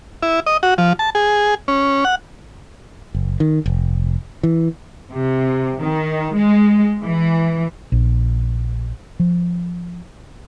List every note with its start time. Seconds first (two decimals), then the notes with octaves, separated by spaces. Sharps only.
0.22 E4
0.46 D#5
0.63 F#4
0.78 F3
0.99 A5
1.15 G#4
1.68 C#4
2.05 F#5
3.15 F#1
3.40 D#3
3.66 F1
4.43 E3
5.11 C3
5.81 D#3
6.34 G#3
7.02 E3
7.92 A#1
9.20 F3